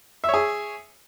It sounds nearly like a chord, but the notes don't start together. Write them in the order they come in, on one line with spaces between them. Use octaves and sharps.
E5 C#5 G#4